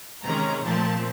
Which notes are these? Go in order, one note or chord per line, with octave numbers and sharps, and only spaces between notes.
C3 D#3 G#3 C#4 A#5
A#2 F3 A3 C4 A5